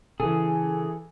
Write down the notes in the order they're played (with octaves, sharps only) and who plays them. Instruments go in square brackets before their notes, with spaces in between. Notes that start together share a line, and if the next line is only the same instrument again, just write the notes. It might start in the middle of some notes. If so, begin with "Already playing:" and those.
[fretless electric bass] C#3 [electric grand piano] E3 A4 [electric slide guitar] G#4